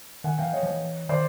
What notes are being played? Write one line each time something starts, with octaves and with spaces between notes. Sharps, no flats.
D#3 F#5 G#5
E3 F5 G5
F3 C#5 D#5
F3
E3
D#3 C5 D5